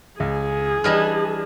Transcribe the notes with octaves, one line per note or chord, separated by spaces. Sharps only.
C#2 G#4
E3 G3 D4 D#5 F6